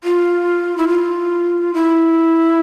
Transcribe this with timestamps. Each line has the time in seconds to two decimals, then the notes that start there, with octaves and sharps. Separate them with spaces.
0.04 F4
0.77 E4
0.88 F4
1.74 E4